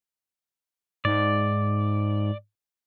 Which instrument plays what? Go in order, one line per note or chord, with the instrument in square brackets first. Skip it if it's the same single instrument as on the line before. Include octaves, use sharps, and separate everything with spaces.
[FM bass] G#2 [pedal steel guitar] D5